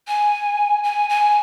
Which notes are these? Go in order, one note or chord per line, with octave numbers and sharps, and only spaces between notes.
G#5
G#5
G#5